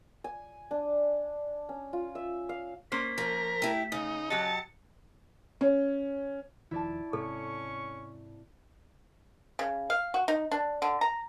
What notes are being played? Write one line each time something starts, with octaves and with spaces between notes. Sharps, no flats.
G#5
D4
C#4
F4
E5
F5
A#3 C#4 C5 B6
F3 A#4
A3 E4 G4
C#3 D#4
F#3 G4 D#5 A5 C#7
C#4
E1 D#3 F3 E4 D5 A5
G#2 C3 C#4 A4 C#6
C#3
F5
F#4
D#4
D4
D3
A#5